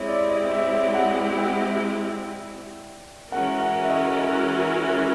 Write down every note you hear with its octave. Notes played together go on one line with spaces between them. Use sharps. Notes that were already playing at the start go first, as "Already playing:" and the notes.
Already playing: G#3 C4 E4 G4 C#5
D5
D#5
E5
E5
F#5
F#5
G5
E3 G#3 C#4 F#4 A#4 F#5
F#5
E5
D#5
D#5